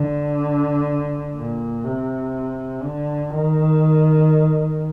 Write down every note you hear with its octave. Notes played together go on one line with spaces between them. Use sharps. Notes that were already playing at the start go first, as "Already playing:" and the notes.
Already playing: D3
A#2
C3
D3
D#3